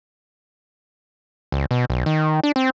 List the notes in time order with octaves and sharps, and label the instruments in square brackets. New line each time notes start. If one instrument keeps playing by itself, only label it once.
[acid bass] C#2
B2
B1
D#3
D4
C4